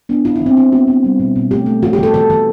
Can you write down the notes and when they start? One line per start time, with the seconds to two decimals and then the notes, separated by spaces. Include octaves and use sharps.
0.09 B3 D4
0.25 E3 E4
0.36 E4
0.41 E3 C4
0.57 E3 E4
0.72 B3 F#4
0.88 B3
1.04 G3
1.19 B2
1.36 B2
1.51 A3 G4
1.66 A3
1.83 E3 F#4
1.93 G4
1.98 E3
2.03 A4
2.14 E3 A4
2.30 E3